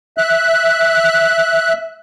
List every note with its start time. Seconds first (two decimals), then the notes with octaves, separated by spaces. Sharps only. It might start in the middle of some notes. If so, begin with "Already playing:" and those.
0.18 E5 F#6